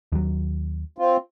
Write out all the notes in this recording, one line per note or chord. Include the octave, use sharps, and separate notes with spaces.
D#2 F#3
C4 F4